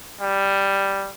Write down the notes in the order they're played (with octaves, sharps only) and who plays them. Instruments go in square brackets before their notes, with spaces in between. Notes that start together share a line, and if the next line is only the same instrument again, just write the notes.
[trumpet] G3